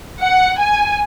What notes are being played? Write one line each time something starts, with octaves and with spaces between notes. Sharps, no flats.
F#5
G#5